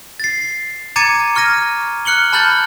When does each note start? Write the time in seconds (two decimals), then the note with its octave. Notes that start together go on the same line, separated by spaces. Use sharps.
0.20 A6 C7
0.96 A#5 D6 G#6 A6 C#7 D#7
1.35 C#6 F6 G#6 A#6 D#7
2.05 F6 F#6 C#7 F#7 G7
2.33 A5 B5 F6 G6 A6 F#7